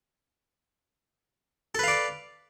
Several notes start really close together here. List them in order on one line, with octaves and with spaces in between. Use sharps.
A4 B4 F5 D5